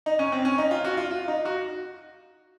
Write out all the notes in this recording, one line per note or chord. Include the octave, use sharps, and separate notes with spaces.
D#4
C#4
C4
C#4
D#4
F4
F#4
F4
F4
D#4
F#4